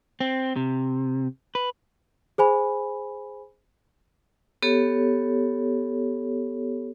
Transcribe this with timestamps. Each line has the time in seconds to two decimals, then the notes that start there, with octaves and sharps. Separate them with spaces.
0.21 C4
0.56 C3
1.55 B4
2.38 G#4 C5 G#5 B5
4.63 B3 G4 A4 C#5